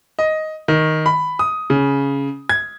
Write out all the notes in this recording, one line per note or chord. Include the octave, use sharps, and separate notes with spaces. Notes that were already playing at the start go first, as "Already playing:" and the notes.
D#5
D#3
B5
D#6
C#3
G#6